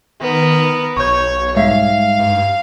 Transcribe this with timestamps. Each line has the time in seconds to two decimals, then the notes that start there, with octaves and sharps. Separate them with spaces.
0.21 D#3 B3 A#4
0.97 B1 C#5 C#6 G6
1.57 G#2 G3 G#3 E5 F5
2.19 G2